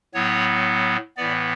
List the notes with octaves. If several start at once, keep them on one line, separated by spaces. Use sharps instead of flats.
A2 F#3 B3 C#5
A2 E3 B3 D5